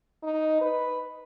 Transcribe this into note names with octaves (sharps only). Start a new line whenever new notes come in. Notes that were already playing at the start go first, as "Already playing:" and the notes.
D#4
B4